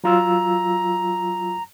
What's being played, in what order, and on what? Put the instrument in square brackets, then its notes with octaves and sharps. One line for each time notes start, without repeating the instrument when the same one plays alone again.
[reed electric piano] F#3 F4 E6 [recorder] A#5